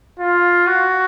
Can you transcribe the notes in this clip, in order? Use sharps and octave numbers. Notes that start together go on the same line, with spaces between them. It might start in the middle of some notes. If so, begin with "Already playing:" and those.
F4
F#4